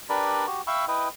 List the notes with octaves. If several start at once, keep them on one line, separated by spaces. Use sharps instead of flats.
D4 G4 A#4 B4 D5 B5
F#4 G4
E5 F5 G5 B5 C#6 E6
E4 B4 D#5 G5